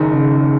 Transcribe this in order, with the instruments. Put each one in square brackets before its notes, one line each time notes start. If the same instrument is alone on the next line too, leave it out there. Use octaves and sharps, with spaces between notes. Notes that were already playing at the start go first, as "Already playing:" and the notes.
Already playing: [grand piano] F#1 F#2 D#3
[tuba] C#3